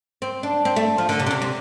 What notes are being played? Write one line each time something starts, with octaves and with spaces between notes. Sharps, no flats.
C4
D4
C4
A3
F3
D3
C3
D3
C3
C3